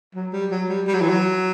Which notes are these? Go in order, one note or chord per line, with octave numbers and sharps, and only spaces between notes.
F#3
G3
F#3
G3
G3
F#3
E3
F#3